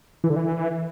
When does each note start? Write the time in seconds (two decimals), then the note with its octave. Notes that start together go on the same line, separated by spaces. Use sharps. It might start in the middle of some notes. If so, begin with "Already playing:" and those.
0.24 E3
0.30 D3
0.36 E3